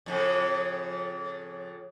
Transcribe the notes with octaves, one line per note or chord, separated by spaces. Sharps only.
F2 A2 C#3